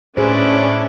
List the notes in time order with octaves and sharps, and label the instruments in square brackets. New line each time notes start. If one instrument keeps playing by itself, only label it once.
[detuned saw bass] A2 [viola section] C#4 D4 [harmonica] E4 B4 D5 [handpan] G#4 C5